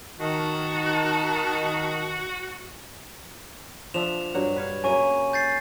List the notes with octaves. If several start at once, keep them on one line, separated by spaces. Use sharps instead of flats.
D#3 D#4 F#4 A5
F3 D4 E5 E7 F7
G2 F#3 F#5
B4 C#5 F5
C#3 F#3 A#3 G#5 C#6 D#7
G6 A6 C7